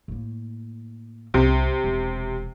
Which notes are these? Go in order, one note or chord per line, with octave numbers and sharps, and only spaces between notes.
A2 A#3
C2 C3
E1 E3